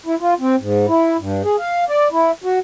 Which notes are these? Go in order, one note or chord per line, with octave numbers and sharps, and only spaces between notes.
E4
F4
C4
G#2
E4
G2
G#4
F5
D5
E4
F#4